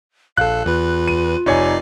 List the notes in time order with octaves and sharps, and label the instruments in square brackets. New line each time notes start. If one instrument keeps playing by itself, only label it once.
[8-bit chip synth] A#1 A4 [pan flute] F5 [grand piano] F#6
[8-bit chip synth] E2 B4 [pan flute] F4
[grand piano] D#7
[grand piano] F1 C#5 G#5 [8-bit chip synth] D#4 D5 C7